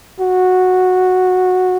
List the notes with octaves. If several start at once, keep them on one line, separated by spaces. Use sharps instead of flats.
F#4